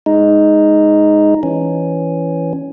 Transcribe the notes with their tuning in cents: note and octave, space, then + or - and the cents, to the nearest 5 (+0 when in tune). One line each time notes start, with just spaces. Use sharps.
G#3 +0 D#4 +0
E3 +5 C#4 +0